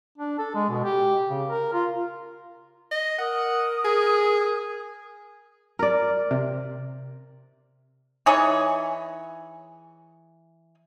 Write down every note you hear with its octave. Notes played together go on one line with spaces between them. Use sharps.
D4
A4
G#3
B2
G4
C#3
A#4
F4
D#5
A#4 F#5 D#6
G#4
A#4 D5
C3
E3 D#4 G#4 C#5